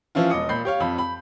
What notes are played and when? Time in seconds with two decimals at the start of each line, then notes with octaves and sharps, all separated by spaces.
0.15 E3 F3 C#4 E4 F4
0.30 E1 D#5 D6 D#6 C#7
0.49 A#2 B5 G6 C7
0.65 G4 C#5 F5
0.80 F2 B5
0.98 B5